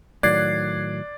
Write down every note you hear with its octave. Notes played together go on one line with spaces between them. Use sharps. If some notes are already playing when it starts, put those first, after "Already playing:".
A2 D#3 F#3 D5 F#6 G#6 C7